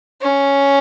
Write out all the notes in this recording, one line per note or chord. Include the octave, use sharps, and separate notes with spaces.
C#4